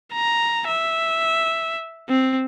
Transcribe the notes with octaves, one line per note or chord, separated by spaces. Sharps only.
A#5
E5
C4